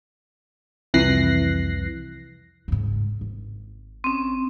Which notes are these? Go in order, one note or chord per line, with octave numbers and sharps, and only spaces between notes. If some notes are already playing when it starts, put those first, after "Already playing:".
C2 F2 E3 F#6 A#6 C7
G#2 C#3
G#1
C4 C#4